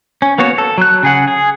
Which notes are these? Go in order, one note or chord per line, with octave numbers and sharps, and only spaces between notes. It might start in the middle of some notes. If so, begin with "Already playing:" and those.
C#4
A#3 B3 F#4 C#5
A4
F#3 F#6
C#3 G#4 F#5
G#4